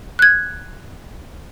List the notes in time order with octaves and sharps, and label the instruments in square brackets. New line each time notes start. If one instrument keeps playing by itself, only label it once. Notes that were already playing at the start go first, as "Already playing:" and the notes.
[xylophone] F#6 G#6